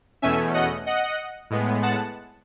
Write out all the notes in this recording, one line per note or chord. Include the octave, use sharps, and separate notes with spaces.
E2 B2 A3 C#4 E5 G#5
D#5 F#5
D#5 F#5
A2 G#3 B3
F#5 A5